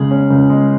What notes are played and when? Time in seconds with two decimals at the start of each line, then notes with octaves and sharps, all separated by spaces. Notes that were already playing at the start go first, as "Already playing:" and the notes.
Already playing: C#2 C#3 G#3 G#4
0.11 C#4
0.30 C#2
0.50 G#3